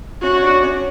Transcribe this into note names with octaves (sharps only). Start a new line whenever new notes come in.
C#4 F#4 C#5
C#5
D4 D5
C#4 C#5